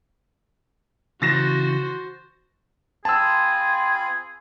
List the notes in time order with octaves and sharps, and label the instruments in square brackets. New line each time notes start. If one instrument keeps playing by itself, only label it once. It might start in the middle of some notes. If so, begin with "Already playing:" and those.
[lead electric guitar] C#3 E3 [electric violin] F#4 C5 [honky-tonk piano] A6 A#6 E7
[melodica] C4 F4 B5 [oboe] G#4 [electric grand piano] A5 E6